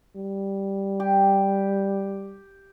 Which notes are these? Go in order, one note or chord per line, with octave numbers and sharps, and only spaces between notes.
G3
G4